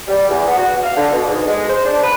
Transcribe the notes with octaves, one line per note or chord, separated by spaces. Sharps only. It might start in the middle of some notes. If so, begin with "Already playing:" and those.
G3
E2
B3
F#4
F5
D3
B2
G#2
G#3
C5
D4
B4